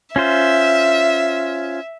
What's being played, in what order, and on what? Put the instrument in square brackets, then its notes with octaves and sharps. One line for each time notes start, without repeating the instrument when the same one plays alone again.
[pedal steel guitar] C#4 F4 C5 [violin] E5